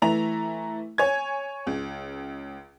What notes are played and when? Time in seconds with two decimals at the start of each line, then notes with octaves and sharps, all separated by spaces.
0.02 E3 A3 E4 A#5 F7
0.98 C#5 G#5 G#6
1.67 C#2